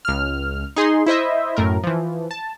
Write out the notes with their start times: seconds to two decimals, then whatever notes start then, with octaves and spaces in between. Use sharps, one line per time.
0.05 C#2 F6
0.76 D#4 G#4 C6
1.06 E4 C5 D#5 E5
1.57 F#2 A2 A#4
1.83 E3 F3
2.31 A5